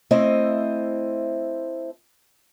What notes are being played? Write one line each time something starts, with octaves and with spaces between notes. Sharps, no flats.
A3 C4 E4 C5 D#5